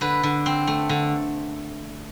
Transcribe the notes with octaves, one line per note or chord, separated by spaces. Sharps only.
D3 B4
D3
C4
A3
D3